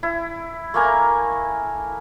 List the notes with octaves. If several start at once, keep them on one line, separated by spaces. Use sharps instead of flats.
E4
A3 A#3 G#5 A#5